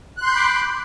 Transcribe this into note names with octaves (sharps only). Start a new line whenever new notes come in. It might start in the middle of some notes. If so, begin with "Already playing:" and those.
B5 C6 D6 F#6 G6